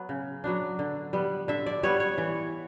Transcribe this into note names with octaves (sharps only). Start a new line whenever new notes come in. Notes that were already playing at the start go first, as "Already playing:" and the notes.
Already playing: F#3 B3
C#3
F#3 B3 D4
D3
G3 B3
D3 E5
D5
G3 B3 C#5
C#5
E3